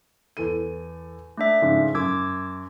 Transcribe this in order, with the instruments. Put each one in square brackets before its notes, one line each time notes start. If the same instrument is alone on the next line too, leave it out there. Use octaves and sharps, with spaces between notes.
[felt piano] E2 A4 D#7
[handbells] A3 D4 E5
[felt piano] G#2 C#3 F3
[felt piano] F#2 [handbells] D6 E6 G#6